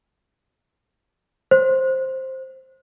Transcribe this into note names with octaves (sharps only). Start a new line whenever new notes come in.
C5